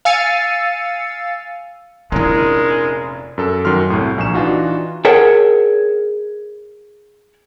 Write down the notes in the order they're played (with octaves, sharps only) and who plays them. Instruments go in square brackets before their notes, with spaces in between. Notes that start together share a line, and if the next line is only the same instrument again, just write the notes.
[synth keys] F5 G#5 E6 A6 C#7 D#7
[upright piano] F1 A#2 C#4 [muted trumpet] G#3 [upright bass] D4 E4 [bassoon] A#4
[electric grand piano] F#2 A4
F#2 D#3 F#3 C6 F6
C2 A2
A#1 G#5 C#6 E7
E3 D4 D#4 F4 F#4
[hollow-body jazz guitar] G#4 A#4 C#5 F#5 G5 A5